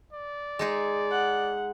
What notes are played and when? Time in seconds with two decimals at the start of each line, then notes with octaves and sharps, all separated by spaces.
0.12 D5
0.59 G#3 D#4 G#4
1.11 F#5